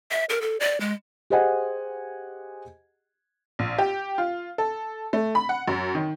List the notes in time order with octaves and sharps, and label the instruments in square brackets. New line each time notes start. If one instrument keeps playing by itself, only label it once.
[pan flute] E5
A#4
A4
D5
G#3
[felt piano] G4 G#4 C5 D#5 F#5 G#5
[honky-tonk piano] A#1
G4
F4
A4
A3
B5
F#5
F#2
D#3